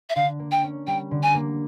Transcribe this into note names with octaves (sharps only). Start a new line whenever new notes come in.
E5
D3 F5
A#3
G5
C#4
G3 G5
D3
G#5
A#3